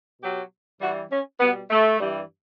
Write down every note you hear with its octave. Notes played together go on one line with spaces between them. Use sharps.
B2 F#3 G4
G2 E3 G3 F#4
C#4
B2 G3 B3
A3
G2 E3 G3